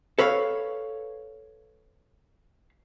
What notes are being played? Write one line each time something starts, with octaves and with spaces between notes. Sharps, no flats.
A4 B4 C#5 F5